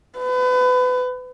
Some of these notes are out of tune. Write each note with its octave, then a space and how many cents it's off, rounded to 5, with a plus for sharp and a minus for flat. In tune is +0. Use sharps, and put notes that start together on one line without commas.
B4 +30